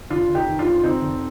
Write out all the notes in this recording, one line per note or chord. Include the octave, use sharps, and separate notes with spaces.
F1 D4 F4
F1
D#4 G4
D#3
D4 F4
F2
F1 C4 D#4
F1